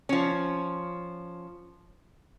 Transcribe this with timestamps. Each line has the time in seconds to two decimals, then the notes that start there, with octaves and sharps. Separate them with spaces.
0.09 F3 C#4